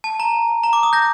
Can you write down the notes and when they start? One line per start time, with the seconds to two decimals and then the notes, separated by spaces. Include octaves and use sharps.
0.04 A5
0.20 A#5
0.64 A#5
0.73 D6
0.83 D#6
0.93 G6 A#6